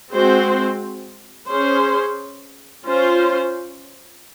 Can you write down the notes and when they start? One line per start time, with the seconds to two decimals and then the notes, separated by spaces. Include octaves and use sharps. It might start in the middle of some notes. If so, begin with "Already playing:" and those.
0.11 G#3 C4 F#4 C5
1.48 C#4 G#4 C5
2.86 C#4 F4 C5